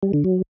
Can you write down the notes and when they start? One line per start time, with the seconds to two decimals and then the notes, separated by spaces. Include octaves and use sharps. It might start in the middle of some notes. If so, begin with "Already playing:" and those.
0.03 G3
0.13 D3
0.24 F#3